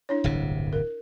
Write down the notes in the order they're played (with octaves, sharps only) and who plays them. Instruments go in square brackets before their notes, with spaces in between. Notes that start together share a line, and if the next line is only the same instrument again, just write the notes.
[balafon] D4 E4 C#5
[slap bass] D1 G1 C3
[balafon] A#4